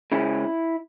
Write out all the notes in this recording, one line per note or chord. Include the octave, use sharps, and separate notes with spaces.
C#3 G#3 C#4 E4